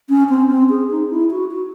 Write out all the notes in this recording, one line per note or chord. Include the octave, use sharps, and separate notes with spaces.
C#4
C4
C4
G#4
D#4
E4
F#4
F#4